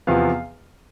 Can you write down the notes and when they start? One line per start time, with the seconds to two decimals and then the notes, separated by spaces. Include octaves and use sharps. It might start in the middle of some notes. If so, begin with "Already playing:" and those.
0.07 E2 C3 F3 B3 F5